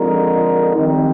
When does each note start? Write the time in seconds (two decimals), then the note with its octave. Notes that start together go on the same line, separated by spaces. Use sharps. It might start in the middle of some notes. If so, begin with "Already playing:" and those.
Already playing: F2 D3 G#3 D#4 A#4
0.75 F2 D#3 G3 C4 D#4